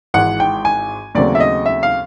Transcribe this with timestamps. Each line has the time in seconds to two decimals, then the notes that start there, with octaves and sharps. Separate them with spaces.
0.14 G#1 G#2 E3 F#5
0.40 G5
0.65 G#5
1.15 D#2 C#3 F#3 A3 C4 D5
1.35 E5
1.40 D#5
1.66 E5
1.83 F5